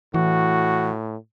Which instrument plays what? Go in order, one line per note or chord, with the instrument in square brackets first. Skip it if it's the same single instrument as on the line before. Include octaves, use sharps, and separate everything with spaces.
[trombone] A2 [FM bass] E3 [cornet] F#4